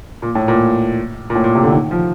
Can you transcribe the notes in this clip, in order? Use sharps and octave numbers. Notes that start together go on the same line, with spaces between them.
A#2
A2
A#2
A#2
A2
A#2
C3
D3
D#3
F3